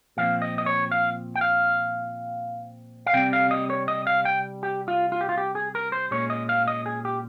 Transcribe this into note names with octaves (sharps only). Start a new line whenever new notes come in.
A#2 F3 C4 F5
D#5
D#5
C#5
F5
G5
F5
F5
C3 G3 C4 G5
F5
D#5
C#5
D#5
F5
G5
G4
F4
F4
G4
F4
G4
G#4
A#4
C5
A#2 G#3 C#4 C#5
D#5
F5
D#5
G#4
G4